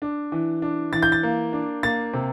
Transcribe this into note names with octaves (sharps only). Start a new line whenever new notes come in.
D4
E3
D4
E3 A6
G6
A6
A#3
D4
A#3 A6
C3